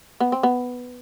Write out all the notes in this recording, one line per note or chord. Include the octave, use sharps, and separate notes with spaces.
B3
C4
B3